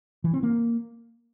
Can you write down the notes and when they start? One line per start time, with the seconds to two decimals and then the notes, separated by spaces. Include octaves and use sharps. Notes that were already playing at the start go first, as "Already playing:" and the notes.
0.24 E3
0.34 C4
0.43 A#3